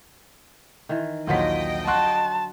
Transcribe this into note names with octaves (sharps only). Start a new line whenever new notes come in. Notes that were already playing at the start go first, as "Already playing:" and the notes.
D#3 E3
A#1 D#2 D3 F3 F#3 D#5 G5 B6
F#4 A5 C6 F#6